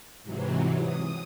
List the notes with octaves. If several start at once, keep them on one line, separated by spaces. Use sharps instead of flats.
G#2 C3 E3 F#3
D#6